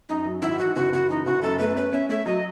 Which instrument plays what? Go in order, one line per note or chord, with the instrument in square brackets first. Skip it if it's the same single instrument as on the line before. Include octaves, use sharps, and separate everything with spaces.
[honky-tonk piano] F#2 [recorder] D#4
[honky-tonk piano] F#3
[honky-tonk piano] G#1 [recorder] E4
[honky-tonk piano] E3 [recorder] F#4
[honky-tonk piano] F#1 [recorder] F#4
[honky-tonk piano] F#1 [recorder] F#4
[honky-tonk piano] E3 [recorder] D#4
[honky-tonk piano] F#1 [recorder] F#4
[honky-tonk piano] F#2 [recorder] A4
[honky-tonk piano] A3 [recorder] B4
[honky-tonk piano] C#4 [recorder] B4
[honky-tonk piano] C#4 [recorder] E5
[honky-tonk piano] A3 [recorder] E5
[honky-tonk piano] F#3 [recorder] D#5